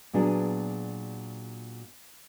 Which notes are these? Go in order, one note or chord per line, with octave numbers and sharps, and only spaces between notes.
A#2 F#3 B3 D4 G#4